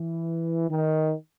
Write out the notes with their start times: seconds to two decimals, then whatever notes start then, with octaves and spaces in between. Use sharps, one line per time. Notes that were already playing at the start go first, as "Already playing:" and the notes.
Already playing: E3
0.69 D#3